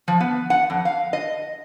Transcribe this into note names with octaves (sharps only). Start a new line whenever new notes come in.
F3
B3
F#5
F2
F5
D#5